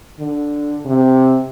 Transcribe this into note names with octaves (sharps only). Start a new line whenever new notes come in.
D3
C3